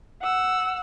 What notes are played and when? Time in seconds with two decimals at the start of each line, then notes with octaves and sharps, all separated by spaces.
0.23 F#5 E6